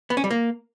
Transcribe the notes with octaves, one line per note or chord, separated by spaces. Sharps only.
B3
C#4
G3
A#3